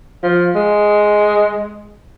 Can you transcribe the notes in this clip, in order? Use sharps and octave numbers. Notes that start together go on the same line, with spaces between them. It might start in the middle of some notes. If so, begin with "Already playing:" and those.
F3
G#3